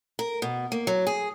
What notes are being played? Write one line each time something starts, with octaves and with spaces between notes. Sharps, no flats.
A#4
B2
A#3
F#3
G#4